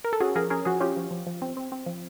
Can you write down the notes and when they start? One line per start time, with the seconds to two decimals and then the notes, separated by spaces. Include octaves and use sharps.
0.04 A#4
0.13 A4
0.20 C#4 F#4 G#4
0.35 F3 G#4 A#4
0.50 C#4 G#4 A#4
0.65 F3 F#4 G#4
0.80 C#4 F4 G4
0.97 F3
1.11 F3
1.27 F3
1.42 C4
1.57 C4
1.72 C4
1.86 F3